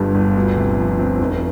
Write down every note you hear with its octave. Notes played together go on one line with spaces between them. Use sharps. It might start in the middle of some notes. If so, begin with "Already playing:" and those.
Already playing: G1 G2 G3
G1
D2
C3
F3
C4
F1